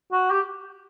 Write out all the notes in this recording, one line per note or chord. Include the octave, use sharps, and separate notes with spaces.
F#4
G4